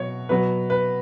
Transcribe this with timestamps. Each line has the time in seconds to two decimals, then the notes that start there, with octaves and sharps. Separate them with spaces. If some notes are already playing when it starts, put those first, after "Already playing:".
Already playing: B2 F#3 C#5
0.29 B2 F#3 B4
0.70 B4